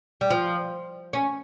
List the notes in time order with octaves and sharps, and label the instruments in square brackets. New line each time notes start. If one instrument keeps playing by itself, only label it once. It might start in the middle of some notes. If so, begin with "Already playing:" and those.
[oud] G3
F3
C#4